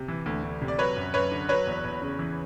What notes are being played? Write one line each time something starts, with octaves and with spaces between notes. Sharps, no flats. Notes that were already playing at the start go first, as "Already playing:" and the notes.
Already playing: C3
E3
D2
D2
C3
D5
F#3 B4 C#5
F#2
F#2 B4 C#5
D3
F#3 B4 C#5
E2
E2
C#3
E3